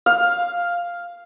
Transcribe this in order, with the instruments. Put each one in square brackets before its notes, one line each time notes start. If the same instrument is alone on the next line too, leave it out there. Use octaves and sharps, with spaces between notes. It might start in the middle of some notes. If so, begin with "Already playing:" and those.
[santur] F5